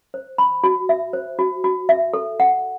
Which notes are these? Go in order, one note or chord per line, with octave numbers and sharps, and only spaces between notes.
C5
B5
F#4
E5
C5
F#4
F#4
E5
A4
F#5